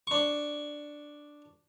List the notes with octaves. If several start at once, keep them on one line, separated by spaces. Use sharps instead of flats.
D4 C#6